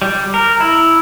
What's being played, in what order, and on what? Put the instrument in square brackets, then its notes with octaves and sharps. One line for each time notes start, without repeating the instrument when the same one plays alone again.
[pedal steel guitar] G3
A#4
E4